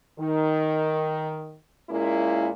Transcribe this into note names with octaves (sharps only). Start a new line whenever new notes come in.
D#3
A#2 G#3 A#3 C#4 E4